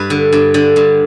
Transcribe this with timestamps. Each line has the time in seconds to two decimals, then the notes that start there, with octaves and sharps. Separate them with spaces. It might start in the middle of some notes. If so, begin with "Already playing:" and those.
Already playing: G2 B4
0.10 D3
0.33 G2
0.54 D3
0.76 G2